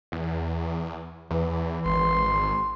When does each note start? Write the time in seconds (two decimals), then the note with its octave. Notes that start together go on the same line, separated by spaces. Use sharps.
0.12 E2
1.30 E2 E3
1.85 G#1 C6